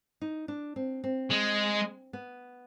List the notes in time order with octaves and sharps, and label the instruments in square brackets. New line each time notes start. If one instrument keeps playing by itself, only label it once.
[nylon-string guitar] D#4
D4
C4
C4
[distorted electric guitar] G#3
[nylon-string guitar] B3